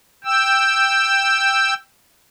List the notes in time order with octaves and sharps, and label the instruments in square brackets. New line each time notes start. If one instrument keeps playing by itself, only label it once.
[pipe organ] G5 E6